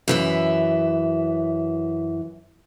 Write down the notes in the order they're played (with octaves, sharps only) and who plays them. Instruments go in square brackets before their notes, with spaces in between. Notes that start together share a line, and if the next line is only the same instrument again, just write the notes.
[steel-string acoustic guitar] F#2 E3 E5